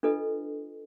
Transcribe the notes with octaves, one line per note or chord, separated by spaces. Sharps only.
D4 F4 A4 B4 D#5